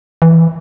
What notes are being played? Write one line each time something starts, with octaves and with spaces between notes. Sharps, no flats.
E3